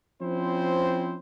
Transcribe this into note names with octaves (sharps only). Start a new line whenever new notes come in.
F3 C4 C#4 E4 C5